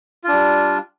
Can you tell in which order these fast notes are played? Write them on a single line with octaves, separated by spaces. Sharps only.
F4 D4 G3